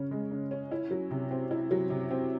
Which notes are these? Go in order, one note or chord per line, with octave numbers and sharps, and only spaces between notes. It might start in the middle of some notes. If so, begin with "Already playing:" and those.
Already playing: C#3 C#4
G#3
C#3
C#4
E4
F#3
C3
C4
E4
F#3
C3
C4